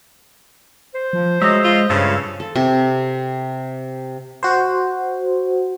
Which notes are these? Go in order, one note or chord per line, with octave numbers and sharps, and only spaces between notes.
C5
F3
F#3 G#3 D#5 E5
F4
G2 C#3 E4 F4 A4
A4
C3
F#4 C5